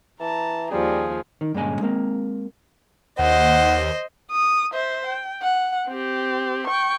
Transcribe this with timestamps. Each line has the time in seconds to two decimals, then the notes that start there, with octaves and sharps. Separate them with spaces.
0.20 E3 A5 A#5
0.71 D#2 F3 G3 G#4
1.41 D#3
1.54 G2 A#2 D3 G#3 C#4 G#5
1.81 G#3 A#3 C4
3.19 D#2 C5 D#5 F#5
4.31 D#6
4.73 C5 E5
5.06 G5
5.42 F#5
5.88 C4 G4
6.67 G5 C#6